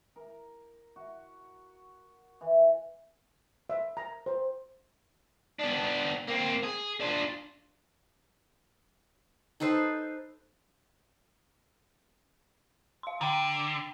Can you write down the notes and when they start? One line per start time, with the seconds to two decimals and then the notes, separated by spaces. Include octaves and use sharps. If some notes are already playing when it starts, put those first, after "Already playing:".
0.16 A#4
0.96 F#4
2.41 E3
3.70 E5
3.97 A#5
4.26 C5
5.60 B3 D4
6.27 A#3 C4
6.63 G#4
7.00 D4 F4
9.60 D#4 A4 B4 C5
13.03 F5 C6
13.21 D3 G5 A#5